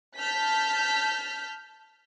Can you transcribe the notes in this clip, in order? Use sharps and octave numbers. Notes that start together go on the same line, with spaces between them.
A5 F6 G6 B6